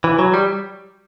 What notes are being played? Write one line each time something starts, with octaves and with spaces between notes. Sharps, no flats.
E3
F#3
G3